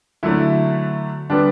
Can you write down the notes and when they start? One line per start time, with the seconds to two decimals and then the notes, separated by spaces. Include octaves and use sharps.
0.23 D3 F#3 A3 E4
1.30 D3 G3 B3 D4